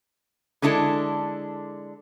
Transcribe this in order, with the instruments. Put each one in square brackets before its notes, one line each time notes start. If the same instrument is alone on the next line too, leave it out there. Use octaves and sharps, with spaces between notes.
[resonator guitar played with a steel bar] D3 G#3 D4 E4 A4